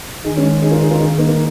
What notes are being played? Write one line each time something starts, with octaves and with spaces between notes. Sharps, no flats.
D#3 D#4 G#4
G#3 C#4
D#4 G#4
F4 A#4
D#4 G#4
F4 A#4
D#3 D#4 G#4
A#3 D#4
A#3